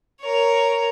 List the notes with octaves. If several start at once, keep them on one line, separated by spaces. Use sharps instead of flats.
A#4 C#5